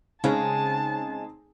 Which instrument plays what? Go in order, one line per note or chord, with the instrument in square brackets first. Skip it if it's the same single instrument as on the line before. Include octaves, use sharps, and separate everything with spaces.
[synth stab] C#3 [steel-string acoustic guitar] G#3 [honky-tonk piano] C4 D#4 G#4 [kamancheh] A5